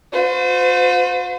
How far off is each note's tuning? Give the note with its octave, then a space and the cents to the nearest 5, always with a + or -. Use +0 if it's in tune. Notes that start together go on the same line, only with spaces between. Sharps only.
F4 +45 C5 -35